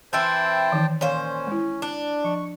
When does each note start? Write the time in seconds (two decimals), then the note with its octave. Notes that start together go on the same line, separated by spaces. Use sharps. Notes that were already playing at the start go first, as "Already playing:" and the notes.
0.13 E3 C4 E4 C5 G5 A5
0.72 D#3 E3 D#4
1.01 A#2 C#4 C5 C#5 F5
1.47 G#3 E4
1.82 D4
2.24 F3 C#6